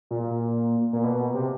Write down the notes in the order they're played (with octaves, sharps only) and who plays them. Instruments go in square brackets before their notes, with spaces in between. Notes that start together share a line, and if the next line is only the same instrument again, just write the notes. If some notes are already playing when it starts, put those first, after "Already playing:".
[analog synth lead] A#2
A#2
B2
C3